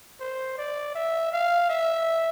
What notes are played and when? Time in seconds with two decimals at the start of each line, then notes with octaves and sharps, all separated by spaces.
0.20 C5
0.58 D5
0.95 E5
1.33 F5
1.70 E5